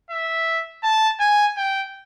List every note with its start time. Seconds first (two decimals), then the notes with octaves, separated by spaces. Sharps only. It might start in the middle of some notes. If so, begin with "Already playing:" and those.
0.10 E5
0.83 A5
1.20 G#5
1.57 G5